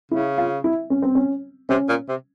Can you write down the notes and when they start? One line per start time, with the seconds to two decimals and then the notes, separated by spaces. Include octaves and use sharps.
0.11 C#3 E4
0.38 F4
0.64 E4
0.90 C#4
1.02 C4
1.15 C#4
1.69 C3 C#4
1.89 A#2
2.09 C3